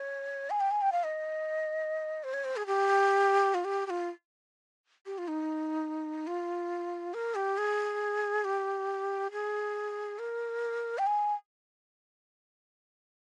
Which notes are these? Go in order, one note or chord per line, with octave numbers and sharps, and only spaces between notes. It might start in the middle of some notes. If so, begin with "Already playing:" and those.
Already playing: C#5
G#5
G5
G#5
G5
F5
D#5
C5
C#5
C5
G#4
G4
F4
G4
G4
F4
G4
F4
D#4
F4
A#4
G4
G#4
G4
G#4
A#4
G5
G#5